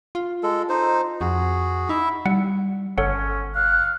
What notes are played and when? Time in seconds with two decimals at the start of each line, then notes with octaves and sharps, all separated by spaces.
0.15 F4
0.43 G#3 A4
0.69 D#4 C5
1.21 F2 F#4 G#4
1.89 D#4 E4 E5
2.26 G3 F#5
2.98 G1 C#4 A4 C#5 F#5
3.55 F5 F#6